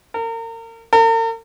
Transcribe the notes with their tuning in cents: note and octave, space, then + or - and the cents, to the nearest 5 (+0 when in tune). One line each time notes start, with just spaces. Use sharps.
A#4 -35
A#4 -45